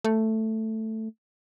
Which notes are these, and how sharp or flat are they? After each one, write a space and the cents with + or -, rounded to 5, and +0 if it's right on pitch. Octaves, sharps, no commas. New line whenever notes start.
A3 +5